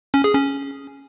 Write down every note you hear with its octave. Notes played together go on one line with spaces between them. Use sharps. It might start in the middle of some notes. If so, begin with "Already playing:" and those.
C#4
G#4
C#4